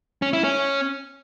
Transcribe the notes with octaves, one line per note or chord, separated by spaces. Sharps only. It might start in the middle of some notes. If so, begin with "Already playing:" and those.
C#4
E4
C#4